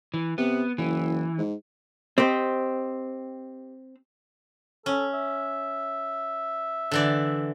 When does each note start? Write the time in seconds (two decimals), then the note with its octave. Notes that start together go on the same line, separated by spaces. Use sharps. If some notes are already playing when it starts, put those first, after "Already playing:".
0.14 E3
0.38 C3 B3
0.78 F#1 E3
1.38 G#2
2.18 C4 G4 C5 D#5
4.86 C#4 A4
5.13 E5
6.91 D3 E3 D5